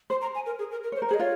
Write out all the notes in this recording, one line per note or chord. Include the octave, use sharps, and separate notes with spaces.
C5 C6
A#5
G#5
A#4
G#4
A#4
A#4
C#5
C5
A#4
C5
G#4
D#5
F4 C#5